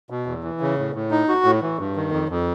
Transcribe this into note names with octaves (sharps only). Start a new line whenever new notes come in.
B2
E2
E3
C#3
A2
A2
D#4
F#4
A2
E3
G2
D#3
F2
F2